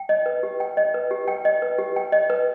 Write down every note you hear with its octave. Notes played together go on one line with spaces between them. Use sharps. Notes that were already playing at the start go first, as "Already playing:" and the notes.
Already playing: G5
D#5
B4
G4
G5
D#5
B4
G4
G5
D#5
B4
G4
G5
D#5
B4